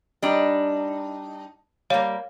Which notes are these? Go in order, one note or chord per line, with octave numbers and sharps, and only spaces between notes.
G3 D4 D#4
G3 A#3 C#5 F5